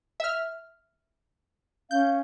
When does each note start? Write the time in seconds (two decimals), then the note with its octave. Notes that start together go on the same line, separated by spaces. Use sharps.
0.20 E5 F6
1.91 C#4 F5 G6